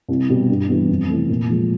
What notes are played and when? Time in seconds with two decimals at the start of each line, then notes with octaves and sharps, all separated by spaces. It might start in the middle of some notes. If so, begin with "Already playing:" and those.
0.08 C2
0.29 B2 G3
0.49 G2
0.69 E3 G3 B3
0.89 F2
1.09 C3 E3 A3 C4
1.29 A#2
1.49 F3 G#3